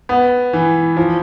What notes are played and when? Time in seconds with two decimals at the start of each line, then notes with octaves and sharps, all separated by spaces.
0.09 B3
0.53 E3
0.97 F3